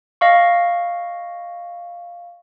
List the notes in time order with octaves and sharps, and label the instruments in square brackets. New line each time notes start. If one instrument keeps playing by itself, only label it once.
[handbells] D#5 F5 C#6